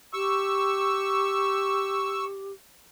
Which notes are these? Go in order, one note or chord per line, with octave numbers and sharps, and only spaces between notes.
G4 C#6 E6